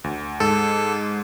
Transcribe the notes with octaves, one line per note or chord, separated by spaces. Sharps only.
D2
G#2 A4